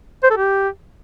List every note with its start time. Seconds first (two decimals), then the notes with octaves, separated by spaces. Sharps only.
0.24 C5
0.30 A4
0.37 G4